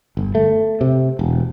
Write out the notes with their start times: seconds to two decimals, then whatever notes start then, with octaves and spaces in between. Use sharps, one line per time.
0.17 G1
0.35 A3
0.81 C3
1.19 E1